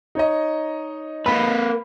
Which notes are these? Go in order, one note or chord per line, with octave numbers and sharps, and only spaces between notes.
D#4 C#5 D#5
A#3 B4 B5